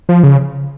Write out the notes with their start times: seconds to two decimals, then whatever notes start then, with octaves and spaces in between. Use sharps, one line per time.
0.09 F3
0.23 C#3